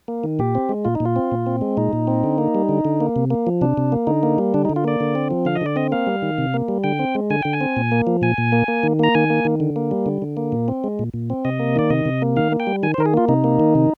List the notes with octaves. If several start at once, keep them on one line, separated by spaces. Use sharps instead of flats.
A#3
D#3
A#2 G4
C4
G#3
A#2 F4
D#4
A#2
F4
C4
A#2
C4
G#3
A#2 D#4
A#2
C4
D3
A#3
G3
D3
D3
A#3
C3
A#3
F3
C3 D4
C3
A#3
D3 D#4
A#3
G3
D3 D4
D#4
D3
F4
A#3 D5
D3
C4
F3
D3 F5
D#5
D3 D5
C4 D#5
A#3 F5
G3
D#3
C3
A#3
G3
D3 G5
C4
G#3
D3 G#5
D3 G5
G#5
C4
A#2
A#3
F3
A#2 G#5
A#2
A#3
A#3
D#3
A#3 A#5
D#3 G#5
A#3
D#3
D3
A#3
G3
D3
D3
A#3
A#2
C4
G#3
A#2
A#2
C4
C3 D#5
A#3
D#3 D5
C3 D#5
C3
A#3
D#3 F5
A#3
G5
G3
D#3 G#5
C5
D#3 A#4
G#4
A#3 F4
C3 D#4
A#3
D#3
C3